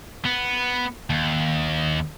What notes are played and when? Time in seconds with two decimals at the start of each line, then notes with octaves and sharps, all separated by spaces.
0.25 B3
1.10 D#2